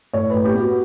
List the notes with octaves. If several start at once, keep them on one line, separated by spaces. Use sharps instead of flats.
A2 C#5
A2 B4
G4
B3 F#4